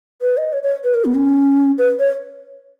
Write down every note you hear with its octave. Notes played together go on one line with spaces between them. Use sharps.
B4
D#5
C#5
C#5
B4
A#4
B3
C#4
B4
C#5